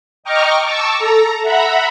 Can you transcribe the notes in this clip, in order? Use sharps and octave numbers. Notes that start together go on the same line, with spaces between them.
D#5 G5 A#5 C#6 D6 F6
A5 C#6 D6 E6
A4 A#5
E5 F#5 A#5 B5